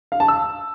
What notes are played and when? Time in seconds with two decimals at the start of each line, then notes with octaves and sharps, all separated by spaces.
0.12 F5
0.20 A5
0.28 E6